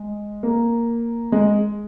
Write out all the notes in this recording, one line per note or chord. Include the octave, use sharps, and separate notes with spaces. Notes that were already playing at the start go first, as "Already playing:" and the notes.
Already playing: G#3
A#3
G#3